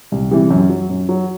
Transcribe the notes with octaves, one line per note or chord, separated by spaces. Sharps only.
C2
C3 E3 G3
F#2
F#3
F#2
F#3